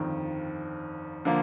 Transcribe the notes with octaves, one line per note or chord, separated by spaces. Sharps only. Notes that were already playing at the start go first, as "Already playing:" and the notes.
Already playing: G1 F2 D#3
D3 F3 A#3